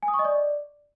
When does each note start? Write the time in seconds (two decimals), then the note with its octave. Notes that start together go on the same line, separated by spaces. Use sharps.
0.03 G#5
0.08 D#6
0.14 C#6
0.19 D#5
0.25 D5